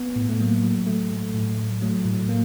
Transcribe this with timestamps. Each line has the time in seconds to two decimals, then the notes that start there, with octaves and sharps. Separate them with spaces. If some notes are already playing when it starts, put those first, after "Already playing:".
Already playing: B3
0.16 A2
0.29 A3
0.40 F#3 A#3
0.64 F#3
0.87 F#3 A3
1.11 A2
1.34 A2
1.57 F#3
1.82 F#3 A3
2.05 A2
2.28 F#3 A#3